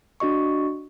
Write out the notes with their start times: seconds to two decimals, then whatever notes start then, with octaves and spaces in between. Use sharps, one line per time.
0.20 D4 F#4 D#5 C#6